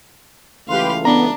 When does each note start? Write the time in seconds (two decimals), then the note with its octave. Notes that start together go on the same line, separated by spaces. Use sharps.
0.69 C#2 E3 A3 G4 B4 F5 C6
1.05 B3 D4 A#5